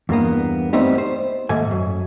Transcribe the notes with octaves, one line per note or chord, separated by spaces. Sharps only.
E2 G2 A#3 B3
G3 A3 B3 C4 D#4
C5
D#2 G#2 A3 G#5
F#2